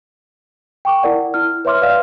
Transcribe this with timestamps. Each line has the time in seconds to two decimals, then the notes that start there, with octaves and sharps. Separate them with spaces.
0.85 G5 C#6 D6
1.03 E4 A#4 D5 F#5
1.34 E4 F6
1.65 B4 C#5 E5 C6 D6 F6
1.82 B4 D5 F5 F6